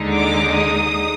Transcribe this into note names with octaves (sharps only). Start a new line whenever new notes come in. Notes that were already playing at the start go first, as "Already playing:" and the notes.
Already playing: D#2 D3 G#3 D#4
D6
D#6